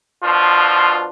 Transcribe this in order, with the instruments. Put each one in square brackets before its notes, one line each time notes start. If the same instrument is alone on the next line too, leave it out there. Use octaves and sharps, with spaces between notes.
[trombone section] B2 F3 D4 F4